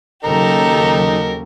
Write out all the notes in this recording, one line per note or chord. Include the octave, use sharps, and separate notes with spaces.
D#2 C#3 F#3 D#4 G4 A4 A#4 A#5